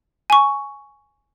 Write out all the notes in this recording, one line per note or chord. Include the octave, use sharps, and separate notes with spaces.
G#5 C#6